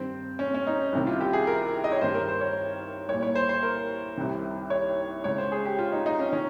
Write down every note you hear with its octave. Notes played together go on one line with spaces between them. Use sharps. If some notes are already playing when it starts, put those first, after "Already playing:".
Already playing: G2 D#3 C4
C#4
C#4
D#4
C2 C3 D#3
F4
G4
G#4
A#4
D#5
C#5
G2 D#3 C5
A#4
C5
C#5
C2 C#5
A#2
C#5
C5
C5
A#4
C2 C3 D#3
C#5
C#2 C#3 C#5
C5
G#4
G4
F4
D#4
D#4
C#4
D#3 C#4